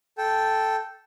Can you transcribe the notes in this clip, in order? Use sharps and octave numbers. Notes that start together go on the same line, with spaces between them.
A4 G5